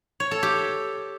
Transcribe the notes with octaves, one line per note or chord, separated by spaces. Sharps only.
C#5
A4
G4